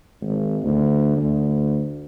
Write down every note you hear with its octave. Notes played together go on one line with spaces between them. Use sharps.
G#1
D2
D2